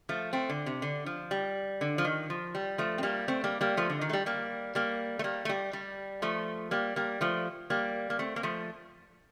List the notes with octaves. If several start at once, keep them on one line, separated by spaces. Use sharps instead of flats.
F3 A3
A3 C4
D3
C3
D3
F3
G3
D3
F3
D#3
F3
G3
F3 A3
C4
G3 A#3
A3 C4
G3 A#3
G3 A#3
F3 A3
D3
D#3
A3
G3
G3 A#3
G3 A#3
A3
G3 A#3
A3
G3
G3
F3 A3
G3 A#3
G3 A#3
F3 A3
G3 A#3
A#3
A3 C4
A#3
F3 A3